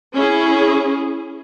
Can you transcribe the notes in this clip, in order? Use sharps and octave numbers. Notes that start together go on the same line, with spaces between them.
C#4 E4 G#4